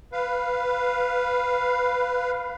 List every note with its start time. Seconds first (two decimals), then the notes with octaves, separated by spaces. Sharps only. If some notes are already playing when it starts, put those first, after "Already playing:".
0.13 B4 F5